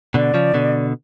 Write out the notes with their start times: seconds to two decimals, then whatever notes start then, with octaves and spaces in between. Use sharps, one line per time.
0.14 B2 D3 D5
0.34 C#3 F3
0.54 B2 D3